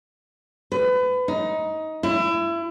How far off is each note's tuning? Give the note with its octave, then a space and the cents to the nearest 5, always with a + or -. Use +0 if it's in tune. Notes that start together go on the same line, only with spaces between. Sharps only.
B4 +30
D#4 +20
E4 +30